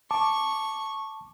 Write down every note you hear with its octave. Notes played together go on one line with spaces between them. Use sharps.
A5 C#6 D6